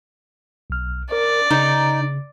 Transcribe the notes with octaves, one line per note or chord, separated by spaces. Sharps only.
B1 F6
A#4 D5
C#3 D#4